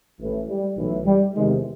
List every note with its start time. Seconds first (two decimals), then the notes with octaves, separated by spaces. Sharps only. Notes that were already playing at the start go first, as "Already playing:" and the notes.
0.19 A1 A2 E3
0.48 G3
0.77 B1 A2 E3
1.06 G3
1.35 E2 C3 D#3 G#3